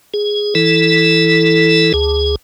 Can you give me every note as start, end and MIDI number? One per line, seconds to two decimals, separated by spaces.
0.14 0.54 68
0.55 1.93 52
0.55 1.93 64
0.55 1.93 69
1.94 2.36 38
1.94 2.36 68